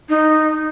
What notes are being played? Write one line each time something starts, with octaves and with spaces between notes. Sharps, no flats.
D#4